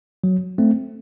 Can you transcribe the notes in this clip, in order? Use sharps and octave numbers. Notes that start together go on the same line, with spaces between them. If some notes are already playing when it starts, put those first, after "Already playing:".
F#3
A3 C4